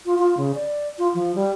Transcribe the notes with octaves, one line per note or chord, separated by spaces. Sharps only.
F4
F4
C#3
D5
F4
F3
G3